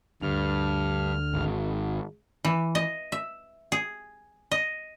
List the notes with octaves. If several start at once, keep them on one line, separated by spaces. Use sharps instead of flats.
D2 G2 D3 F6
G#1
E3
D#5
E5
G#4
D#5